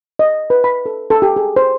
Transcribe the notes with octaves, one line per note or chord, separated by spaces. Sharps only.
D#5
B4
B5
A4
A4
G4
G#4
C5